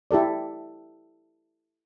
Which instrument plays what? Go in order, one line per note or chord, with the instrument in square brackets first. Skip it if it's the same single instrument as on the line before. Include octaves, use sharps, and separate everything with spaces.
[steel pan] E4 G4 A4 D5